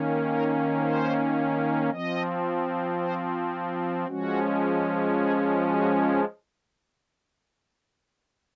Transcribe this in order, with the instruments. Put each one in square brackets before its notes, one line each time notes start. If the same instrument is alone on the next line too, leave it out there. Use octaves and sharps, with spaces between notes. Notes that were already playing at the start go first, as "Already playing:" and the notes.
Already playing: [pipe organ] D#3 A#3 C#4
A#4
C5
F3 C4 D#5
C5
F3 G#3 C#4 F#4
G#4
F#4